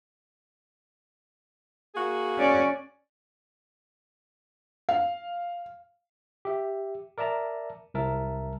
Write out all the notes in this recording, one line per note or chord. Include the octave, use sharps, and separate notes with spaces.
A#3 F#4 G#4
C#4 D5
F5
G4 E5
A#4 D5 E5 A5 A#5
C2 A#4 E5 A5